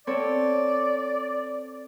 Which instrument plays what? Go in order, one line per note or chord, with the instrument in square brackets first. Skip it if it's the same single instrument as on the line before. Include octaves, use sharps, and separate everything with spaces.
[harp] C4 A4 C#5 [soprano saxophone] D5